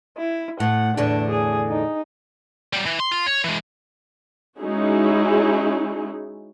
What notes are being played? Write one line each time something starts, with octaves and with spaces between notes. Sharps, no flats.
E4
A2 F#5
E2 A2 D3 D4
G#4
D#4
F#3 G3
E3
C6
F4
C#5
E3 G#3
G#3 C#4 D#4 E4 F#4 G#4